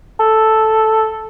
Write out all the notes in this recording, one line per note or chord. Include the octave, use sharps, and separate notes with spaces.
A4